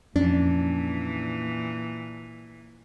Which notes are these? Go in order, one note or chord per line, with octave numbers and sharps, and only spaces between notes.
F2 A#2 E3 C#4 D4